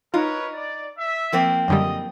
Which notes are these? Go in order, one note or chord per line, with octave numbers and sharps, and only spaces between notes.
D#4 F4 A#4 B4 C#5
D5
E5
F3 A#3 C4
F#2 D3 G3 D#5